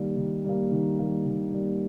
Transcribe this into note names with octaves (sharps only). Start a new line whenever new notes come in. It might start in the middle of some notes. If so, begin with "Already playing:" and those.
Already playing: D#3 G3 A#3
D#3
G3 A#3
D#3
G3 A#3
D#3
G3 A#3